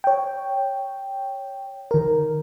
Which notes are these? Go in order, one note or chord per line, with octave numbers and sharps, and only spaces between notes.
C#5 G5
D#3 A#4